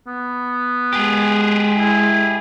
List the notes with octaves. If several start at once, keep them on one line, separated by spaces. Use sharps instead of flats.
B3
G#3 G4 G#4
E4